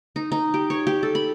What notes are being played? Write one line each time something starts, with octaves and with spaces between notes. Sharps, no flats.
D#4
D#4
G4
C#5
G4
A4
B5